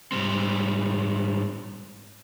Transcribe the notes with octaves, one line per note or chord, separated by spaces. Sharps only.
G#2 G3 C4